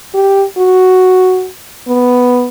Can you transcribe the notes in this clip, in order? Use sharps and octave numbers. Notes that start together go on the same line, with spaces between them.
G4
F#4
B3